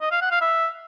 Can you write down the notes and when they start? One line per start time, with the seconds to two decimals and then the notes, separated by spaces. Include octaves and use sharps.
0.02 D#5
0.11 F5
0.21 F#5
0.31 F5
0.41 E5